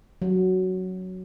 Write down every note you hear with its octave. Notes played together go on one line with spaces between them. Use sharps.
F#3